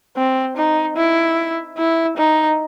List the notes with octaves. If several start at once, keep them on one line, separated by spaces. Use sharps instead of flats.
C4
D#4
E4
E4
D#4